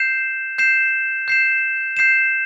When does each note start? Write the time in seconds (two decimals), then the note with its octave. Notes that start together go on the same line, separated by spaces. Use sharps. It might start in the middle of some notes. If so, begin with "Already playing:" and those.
Already playing: G6 C7 E7
0.58 G6 C7 E7
1.28 G6 C7 E7
1.97 G6 C7 E7